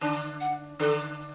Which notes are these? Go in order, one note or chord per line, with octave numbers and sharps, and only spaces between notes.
D3 D4 A5
F#5
D3 D4 A4